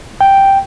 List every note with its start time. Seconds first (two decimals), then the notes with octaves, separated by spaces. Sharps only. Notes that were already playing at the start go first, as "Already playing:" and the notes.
0.21 G5